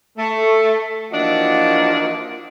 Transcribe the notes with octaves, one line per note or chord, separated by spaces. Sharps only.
A3
E3 F3 A#3 D4 D#4 F#4